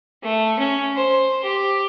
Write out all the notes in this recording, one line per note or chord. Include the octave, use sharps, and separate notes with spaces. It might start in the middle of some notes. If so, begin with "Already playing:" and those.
A3
C#4
C5
G4